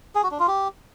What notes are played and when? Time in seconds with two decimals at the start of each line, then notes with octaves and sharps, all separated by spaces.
0.15 G#4
0.23 F#4
0.31 D4
0.39 F4
0.47 G4